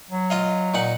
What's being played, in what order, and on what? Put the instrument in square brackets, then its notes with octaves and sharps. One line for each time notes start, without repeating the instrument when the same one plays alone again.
[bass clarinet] F#3
[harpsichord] F4 D#5 F5
A#2 D#4 F#5